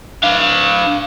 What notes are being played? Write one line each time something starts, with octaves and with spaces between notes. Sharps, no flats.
D4 F5